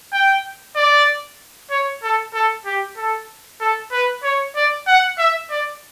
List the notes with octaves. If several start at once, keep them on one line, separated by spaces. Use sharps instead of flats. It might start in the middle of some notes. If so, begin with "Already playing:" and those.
G5
D5
C#5
A4
A4
G4
A4
A4
B4
C#5
D5
F#5
E5
D5